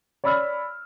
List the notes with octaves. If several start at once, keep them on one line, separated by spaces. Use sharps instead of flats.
C#5 D5 B5 E6 F6